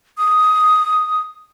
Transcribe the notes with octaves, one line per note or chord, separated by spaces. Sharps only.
D#6